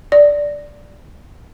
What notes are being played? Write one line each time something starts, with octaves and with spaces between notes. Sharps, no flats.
D5